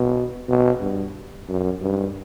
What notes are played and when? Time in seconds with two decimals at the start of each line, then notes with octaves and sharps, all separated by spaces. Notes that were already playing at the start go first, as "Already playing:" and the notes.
Already playing: B2
0.48 B2
0.81 G2
1.49 F#2
1.82 G2